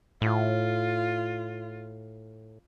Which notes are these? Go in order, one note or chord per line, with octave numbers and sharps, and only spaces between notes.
A2 F4